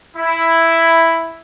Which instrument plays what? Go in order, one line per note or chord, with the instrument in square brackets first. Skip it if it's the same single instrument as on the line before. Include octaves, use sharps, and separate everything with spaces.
[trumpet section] E4